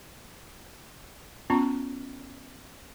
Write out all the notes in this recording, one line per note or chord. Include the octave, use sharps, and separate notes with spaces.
B3 C#4 F4 A#5 C#6